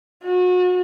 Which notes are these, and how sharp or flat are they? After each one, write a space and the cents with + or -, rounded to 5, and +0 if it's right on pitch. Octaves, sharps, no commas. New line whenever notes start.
F#4 -35